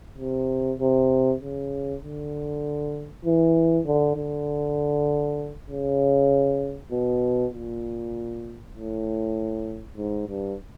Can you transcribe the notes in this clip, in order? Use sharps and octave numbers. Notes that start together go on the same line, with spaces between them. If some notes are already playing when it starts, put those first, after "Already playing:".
C3
C3
C#3
D3
E3
D3
D3
C#3
B2
A#2
A2
G#2
G2